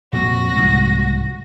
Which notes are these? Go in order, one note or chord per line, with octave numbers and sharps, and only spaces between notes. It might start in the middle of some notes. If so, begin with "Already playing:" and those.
F2 A#2 C4 F#4 A#6
C2 G#2 F3